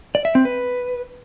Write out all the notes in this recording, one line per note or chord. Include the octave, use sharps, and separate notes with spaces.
D5
E5
C4
B4